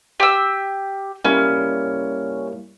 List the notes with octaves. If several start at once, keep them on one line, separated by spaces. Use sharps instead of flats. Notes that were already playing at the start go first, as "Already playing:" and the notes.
G4 E6
G3 A#3 C#4 E4